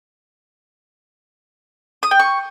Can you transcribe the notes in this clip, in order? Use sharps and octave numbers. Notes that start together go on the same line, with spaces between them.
D#6
G5
C#6